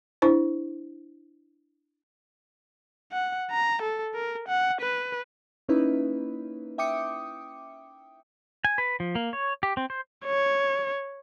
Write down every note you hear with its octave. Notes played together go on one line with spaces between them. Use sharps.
D4 E4 C5
F#5
A#5
A4
A#4
F#5
B4
A#3 C#4 D#4 E4 B4
E5 G5 D6 D#6 C#7
G#5
B4
F3
A#3
C#5
G4
C4
C5
C#5